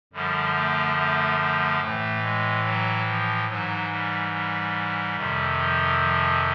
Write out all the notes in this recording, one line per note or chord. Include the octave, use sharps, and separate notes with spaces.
F#2 D3 F3 G3
A3
A3
A3
A2 E3 A3
G#3
F#3
F3
G#2 E3 F#3
G3
G3
F2 C3 D#3
F3
F3